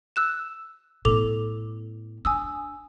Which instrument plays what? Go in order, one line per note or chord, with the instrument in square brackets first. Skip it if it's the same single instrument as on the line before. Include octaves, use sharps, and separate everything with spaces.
[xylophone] E6 F#6 E7
[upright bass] A2 B3 [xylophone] A4 D6 F7
[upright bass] D4 [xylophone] G#5 D#6 E6